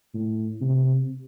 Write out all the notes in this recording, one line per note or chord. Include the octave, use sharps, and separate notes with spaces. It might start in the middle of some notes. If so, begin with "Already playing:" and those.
A2
C3